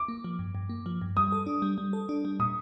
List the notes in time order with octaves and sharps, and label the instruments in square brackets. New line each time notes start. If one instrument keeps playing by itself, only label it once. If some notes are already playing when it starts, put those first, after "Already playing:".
Already playing: [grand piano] D6
[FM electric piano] A#3
F3
G2
G2
A#3
F3
G2
[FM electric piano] G3 [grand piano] D#6
[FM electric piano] A4
D4
G3
G3
A4
D4
G3
[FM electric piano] A#2 [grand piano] D#6